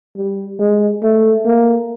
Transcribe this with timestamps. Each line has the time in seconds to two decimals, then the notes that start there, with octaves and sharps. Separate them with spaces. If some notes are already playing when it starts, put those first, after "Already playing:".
0.17 G3
0.59 G#3
1.03 A3
1.45 A#3